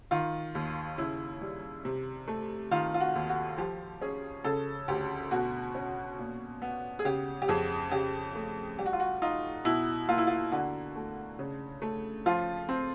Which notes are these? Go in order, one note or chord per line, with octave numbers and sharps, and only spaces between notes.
D#3 F4
D#2
C#3 E4
G3
C3
A3
D#3 F4
F4
F#4
D#2
F#4
F3 G4
C#4 G#4
C#3 A4
D2 G4
B2 F#4
C#4
A#2
B3
G#4
C#3 G4
G4
F2 G#4
C#3 G4
A3
G3 G4
F#4
F4
F#4
D#4 F4
B2 E4
A#3 F4
E4
F4
D3 F#4
A3
C#3
A3
F3 F4
C4